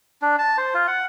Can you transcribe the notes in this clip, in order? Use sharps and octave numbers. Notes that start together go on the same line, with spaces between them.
D4
A5
C5
F4
F#5